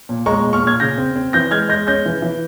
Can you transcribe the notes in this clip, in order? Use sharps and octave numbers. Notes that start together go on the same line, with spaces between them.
A#2
G#3 A#5 C#6
A#2
C#6 F6
A#2 F6 G#6
C#3 G6 A#6
C4
C4
E3 G6 A#6
G#3 F6 G#6
G#3 G6 A#6
C#4 G6 A#6
E3
E3